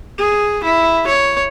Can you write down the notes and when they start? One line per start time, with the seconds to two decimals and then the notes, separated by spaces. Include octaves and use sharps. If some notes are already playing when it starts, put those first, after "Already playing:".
0.18 G#4
0.63 E4
1.07 C#5